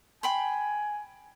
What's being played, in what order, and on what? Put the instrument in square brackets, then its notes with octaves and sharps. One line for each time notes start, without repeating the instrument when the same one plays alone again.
[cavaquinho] G5 B5 C6 [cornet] G#5